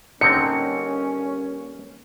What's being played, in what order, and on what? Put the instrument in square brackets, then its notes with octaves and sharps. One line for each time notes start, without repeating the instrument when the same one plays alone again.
[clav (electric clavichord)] D3 C4 D#4 [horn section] G3 A#3 C#4 [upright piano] C#7